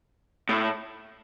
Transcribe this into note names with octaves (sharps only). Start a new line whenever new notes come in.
A2